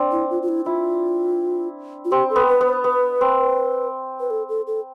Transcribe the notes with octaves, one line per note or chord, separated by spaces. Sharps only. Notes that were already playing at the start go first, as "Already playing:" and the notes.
Already playing: C4 D4
E4
F4
F4
E4
E4 F4
F4
C4 G4
A4
B3
B4
B3
C5
B3 B4
C4
B4
A4
A4
A4